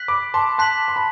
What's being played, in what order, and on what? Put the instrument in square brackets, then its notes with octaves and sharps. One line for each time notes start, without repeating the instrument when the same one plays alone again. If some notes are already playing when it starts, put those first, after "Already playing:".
Already playing: [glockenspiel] F#6 B6 F#7
[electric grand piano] B5 D6
A5 C6
[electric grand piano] A5 C6 [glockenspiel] F#6 B6 F#7
[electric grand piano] C6
B5